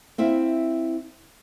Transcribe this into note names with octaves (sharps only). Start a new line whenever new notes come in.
C4 E4 E5 F5